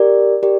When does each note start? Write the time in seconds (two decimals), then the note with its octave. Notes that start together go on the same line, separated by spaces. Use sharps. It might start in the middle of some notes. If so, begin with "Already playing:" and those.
Already playing: G4 A#4 D5
0.43 G4 A#4 D5